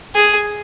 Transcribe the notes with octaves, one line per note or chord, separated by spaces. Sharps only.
G#4